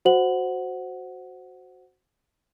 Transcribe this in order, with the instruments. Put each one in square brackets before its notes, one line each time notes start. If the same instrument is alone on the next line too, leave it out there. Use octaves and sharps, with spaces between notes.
[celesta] F#4 C5 F#5 F#7